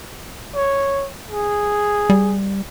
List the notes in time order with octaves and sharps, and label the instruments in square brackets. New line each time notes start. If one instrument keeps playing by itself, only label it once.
[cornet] C#5
G#4
[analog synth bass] G3